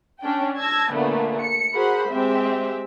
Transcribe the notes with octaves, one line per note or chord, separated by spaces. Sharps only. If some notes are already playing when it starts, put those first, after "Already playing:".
C#4 D4 G5
A5 E6 G#6 A#6
A#2 D3 A3 B3
C#7
F#4 G#4 A#4 C5 F#5 B5
G#3 C4 G4 E5